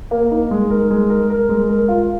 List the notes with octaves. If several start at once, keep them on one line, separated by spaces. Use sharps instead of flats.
A#3
D#4
G#3
A#4
G#3
A#4
A#4
G#3
A#4
F4